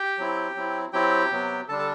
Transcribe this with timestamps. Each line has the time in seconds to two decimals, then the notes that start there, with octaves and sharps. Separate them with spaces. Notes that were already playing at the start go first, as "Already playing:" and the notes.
Already playing: G4 G5
0.18 F#3 C4 E4
0.55 F#3 C4 E4
0.93 F#3 C4 E4 G4 G5
1.32 C3 F#3 B3
1.68 D3 G3 D4 A4 A5
1.79 A4 A5